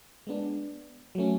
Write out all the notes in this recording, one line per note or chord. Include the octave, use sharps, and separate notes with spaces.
G#3 B3 D4
F#3 A3 C#4